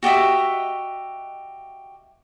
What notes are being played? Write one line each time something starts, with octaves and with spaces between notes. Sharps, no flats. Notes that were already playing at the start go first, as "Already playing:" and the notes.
F#4 G4 D#5 E5